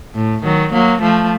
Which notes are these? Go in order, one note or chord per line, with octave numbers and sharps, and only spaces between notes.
A2
D#3 F#3
F#3 A#3
F3 A3